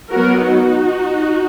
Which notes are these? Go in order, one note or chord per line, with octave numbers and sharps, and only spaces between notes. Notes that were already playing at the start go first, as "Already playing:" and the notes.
F#3 B3 F#4 A#4
D#4 F#4